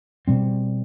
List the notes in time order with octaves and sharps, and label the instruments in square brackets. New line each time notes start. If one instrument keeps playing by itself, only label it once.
[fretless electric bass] B2 G3 C4